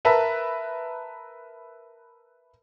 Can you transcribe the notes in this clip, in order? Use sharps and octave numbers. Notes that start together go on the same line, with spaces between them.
A#4 B4 E5 A5